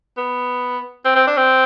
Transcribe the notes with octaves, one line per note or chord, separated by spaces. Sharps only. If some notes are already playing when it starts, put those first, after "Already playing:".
B3
C4
C4
D4
C4